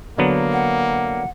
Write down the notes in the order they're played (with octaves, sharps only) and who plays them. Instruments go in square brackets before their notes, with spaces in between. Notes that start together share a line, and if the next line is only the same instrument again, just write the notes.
[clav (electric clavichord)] D3 F#3 B3 [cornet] A#3
[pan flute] F#5